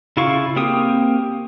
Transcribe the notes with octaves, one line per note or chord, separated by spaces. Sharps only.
C#3 E4 F4 F5 C#6
A#3 C4 G4 D#6